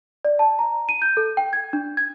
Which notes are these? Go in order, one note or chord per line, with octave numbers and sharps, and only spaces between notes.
D5
A5
A#5
D#7
G6
A4
G5
G#6
D4
G#6